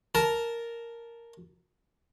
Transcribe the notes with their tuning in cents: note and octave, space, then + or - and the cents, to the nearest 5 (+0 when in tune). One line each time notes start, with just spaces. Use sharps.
A#4 -5 A5 -10